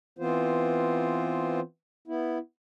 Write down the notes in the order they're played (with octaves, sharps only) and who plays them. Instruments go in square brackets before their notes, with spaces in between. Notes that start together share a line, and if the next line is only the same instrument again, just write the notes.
[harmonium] E3 B3 C4 F4 C5
B3 E4